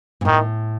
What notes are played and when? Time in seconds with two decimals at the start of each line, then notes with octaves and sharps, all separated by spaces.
0.21 A#2
0.25 A2 D#3